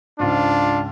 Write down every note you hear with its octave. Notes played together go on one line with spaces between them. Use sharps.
C#2 G#2 D4 F4